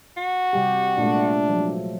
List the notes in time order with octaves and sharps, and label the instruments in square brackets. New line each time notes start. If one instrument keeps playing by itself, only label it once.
[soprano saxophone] F#4
[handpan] C3 G3 G4
[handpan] A#2 G#3 A3 [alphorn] D4
[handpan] F3 F#3